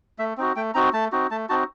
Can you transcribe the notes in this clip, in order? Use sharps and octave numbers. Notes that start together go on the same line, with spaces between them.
A3 E5
C4 D#4 F#4
A3 G5
C4 D#4 F#4 A#5
A3 A5
C4 D#4 F#4
A3 A5
C4 D#4 F#4 A5